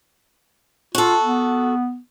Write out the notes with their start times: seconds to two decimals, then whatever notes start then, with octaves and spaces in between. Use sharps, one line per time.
0.95 F4 F#4 A4
1.23 B3